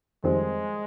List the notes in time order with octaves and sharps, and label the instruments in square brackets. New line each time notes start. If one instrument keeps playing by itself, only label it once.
[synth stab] F2 D#3 G3 C4 [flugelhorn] G#3